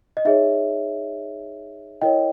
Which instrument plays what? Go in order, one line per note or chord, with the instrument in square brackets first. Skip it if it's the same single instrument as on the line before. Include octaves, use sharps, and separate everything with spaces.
[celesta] D#5
D#4 G#4 C#5 E5
E4 A#4 C#5 D#5 G5